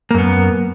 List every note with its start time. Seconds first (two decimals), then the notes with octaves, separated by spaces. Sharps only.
0.11 A#3
0.14 F#2
0.18 B3